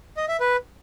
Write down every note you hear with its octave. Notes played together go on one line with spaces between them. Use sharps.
D#5
E5
B4